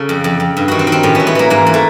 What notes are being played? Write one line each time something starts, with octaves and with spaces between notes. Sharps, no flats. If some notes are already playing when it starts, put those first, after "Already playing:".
Already playing: C#3 A4
F2
F2
F2
G2
D#3 F#4
C4
D#3
C4
A2 C#4
E3 B3
B3
E3 A#3
G#2 A#3
E3
A3